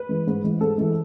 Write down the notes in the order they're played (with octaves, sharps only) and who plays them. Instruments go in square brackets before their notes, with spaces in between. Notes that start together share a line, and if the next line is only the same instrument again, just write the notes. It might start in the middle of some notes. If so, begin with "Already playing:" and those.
Already playing: [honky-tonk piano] B4
E3 G#3
G#2
E3 G#3
G#2 A4
E3 G#3